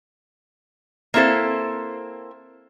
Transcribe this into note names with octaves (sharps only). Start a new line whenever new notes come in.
A#3 C4 E4 A4 C5